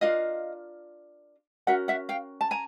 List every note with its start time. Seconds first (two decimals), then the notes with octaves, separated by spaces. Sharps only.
0.01 D4 F4 A#4 D#5 F5
1.67 C#4 F#4 A#4 E5 F#5
1.88 E5 F#5
2.09 F5 G5
2.41 A5
2.51 G#5 A#5